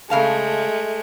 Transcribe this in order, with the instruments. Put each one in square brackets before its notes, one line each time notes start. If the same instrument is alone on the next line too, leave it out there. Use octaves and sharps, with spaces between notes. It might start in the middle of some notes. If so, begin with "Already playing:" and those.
[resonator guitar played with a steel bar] C#3 F5 A5 [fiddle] G#3 A3